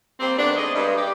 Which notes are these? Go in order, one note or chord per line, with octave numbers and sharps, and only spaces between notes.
G3 A#3 C4
D#3 A3 B3 D4
G#3 A3 D#5
G2
G4